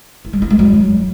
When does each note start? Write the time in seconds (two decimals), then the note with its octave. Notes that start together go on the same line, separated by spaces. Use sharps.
0.25 E4
0.33 G3
0.42 E4
0.50 G#3
0.59 F#3